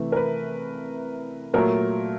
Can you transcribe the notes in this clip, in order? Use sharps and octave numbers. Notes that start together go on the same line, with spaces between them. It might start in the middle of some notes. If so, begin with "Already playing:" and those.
Already playing: C3 E3 A3
A#4
B4
A#2 F#3 A3 A#4